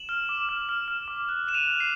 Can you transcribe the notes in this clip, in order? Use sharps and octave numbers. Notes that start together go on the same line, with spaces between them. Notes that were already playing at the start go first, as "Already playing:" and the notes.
Already playing: E7 F#7
F6
D6
F6
F6
F6
D6
F#6
F#6 E7
D#7 F7
F#6
C7